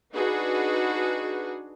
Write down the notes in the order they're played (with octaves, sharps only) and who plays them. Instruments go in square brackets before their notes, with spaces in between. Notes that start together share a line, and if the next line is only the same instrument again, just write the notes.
[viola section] D4 D#4 F#4 G#4 B4